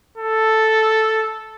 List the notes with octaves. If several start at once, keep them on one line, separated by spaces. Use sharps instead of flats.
A4